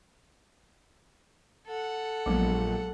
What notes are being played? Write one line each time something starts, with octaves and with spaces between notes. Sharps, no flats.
A4 F#5
A#1 F#3 G#3 B3